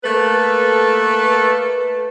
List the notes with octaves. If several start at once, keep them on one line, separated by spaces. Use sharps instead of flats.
A3 A#3 A4 B4